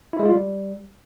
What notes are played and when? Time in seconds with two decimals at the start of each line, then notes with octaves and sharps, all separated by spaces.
0.13 E4
0.19 G#3
0.25 F4
0.32 G3